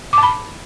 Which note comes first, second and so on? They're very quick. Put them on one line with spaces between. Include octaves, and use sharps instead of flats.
D6 A5 B5